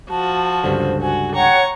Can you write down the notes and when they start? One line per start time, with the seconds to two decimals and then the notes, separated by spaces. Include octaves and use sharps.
0.10 F3 F#4 A5
0.64 C#2 G2 D3 C5
1.02 F#4 G#5
1.35 C#5 F#5 G5 A#5 C#6